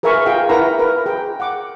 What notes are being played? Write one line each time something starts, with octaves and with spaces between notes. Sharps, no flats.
G#4 A#4 B4 E5 G#5 C#6
F4 G#4 F5 G5
E4 A#4 B4 E5 F#5 A#5
A#4 B4
G#4 G5
F#5 D6